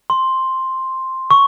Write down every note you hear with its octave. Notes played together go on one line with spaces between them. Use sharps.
C6
C#6